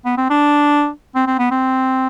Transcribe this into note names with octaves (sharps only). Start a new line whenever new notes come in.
B3
C4
D4
C4
C4
B3
C4